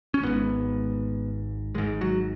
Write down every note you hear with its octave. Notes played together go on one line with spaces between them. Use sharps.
C#4
G#1 G#2 B3
G#1 G#2 G#3
F#3